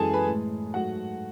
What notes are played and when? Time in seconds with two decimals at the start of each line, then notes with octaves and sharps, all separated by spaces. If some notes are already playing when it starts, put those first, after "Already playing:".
Already playing: F#2 E3 G#3 G#4 A4 G#5 A5
0.13 B4 B5
0.26 A2 G#3
0.74 G#2 F#3 A3 F#4 F#5